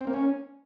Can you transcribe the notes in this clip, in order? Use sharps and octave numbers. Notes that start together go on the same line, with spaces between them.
C4
A#3
C#4